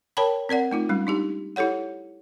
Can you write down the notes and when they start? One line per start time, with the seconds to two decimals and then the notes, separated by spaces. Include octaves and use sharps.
0.17 A#4 C#5 G5 A5 B5
0.49 C4 A#4 D5 F#5
0.71 A3 D#4 F4
0.89 G3 G#3 C#4
1.07 D4 D#4 G4
1.56 E4 G4 A4 C#5 F#5